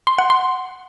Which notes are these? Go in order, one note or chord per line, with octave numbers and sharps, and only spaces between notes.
C6
F#5
C6